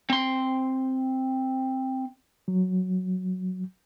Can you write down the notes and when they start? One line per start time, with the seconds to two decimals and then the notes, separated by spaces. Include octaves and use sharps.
0.10 C4 C6
2.48 F#3